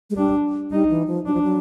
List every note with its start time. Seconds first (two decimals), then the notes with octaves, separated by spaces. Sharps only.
0.10 G#3
0.16 G3 D4
0.71 G3 D#4
0.90 E3
1.07 F3
1.26 F#3 D4
1.33 F3
1.42 F#3